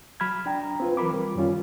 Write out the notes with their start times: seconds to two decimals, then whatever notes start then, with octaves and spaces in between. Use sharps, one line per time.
0.20 F#3 B5 F6 G#6
0.46 D4 G5 A#5
0.80 C4 F4 B4
0.97 E3 F#3 A#4 B5 D6
1.13 G3
1.35 F#2 D#3 G3 C#4 F4